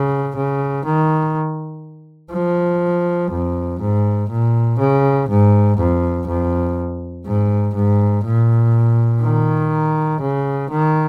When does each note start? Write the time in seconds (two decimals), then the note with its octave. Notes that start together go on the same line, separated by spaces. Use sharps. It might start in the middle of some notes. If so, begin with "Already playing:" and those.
Already playing: C#3
0.36 C#3
0.85 D#3
2.32 F3
3.32 F2
3.81 G#2
4.30 A#2
4.79 C#3
5.29 G#2
5.78 F2
6.27 F2
7.26 G#2
7.76 G#2
8.25 A#2
9.23 D#3
10.22 C#3
10.70 D#3